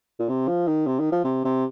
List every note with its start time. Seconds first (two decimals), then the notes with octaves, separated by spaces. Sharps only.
0.19 A#2
0.29 C3
0.48 F3
0.67 D#3
0.87 C3
0.99 D#3
1.12 F3
1.24 C3
1.45 C3